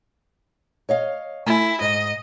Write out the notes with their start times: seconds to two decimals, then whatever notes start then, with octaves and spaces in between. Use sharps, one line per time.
0.89 C#5 D#5 F5
1.46 A3 E4 G#5
1.81 G#2 D#5